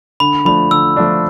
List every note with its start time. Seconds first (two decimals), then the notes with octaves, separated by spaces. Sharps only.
0.20 D3 B5
0.45 F3 A3 D4 B5
0.71 D3 E6
0.96 F3 A3 D4